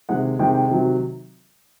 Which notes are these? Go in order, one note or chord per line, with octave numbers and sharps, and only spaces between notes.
C3 D#3 G#3 F#5
C3 D#3 G#3 G5
G5
C3 D#3 F#3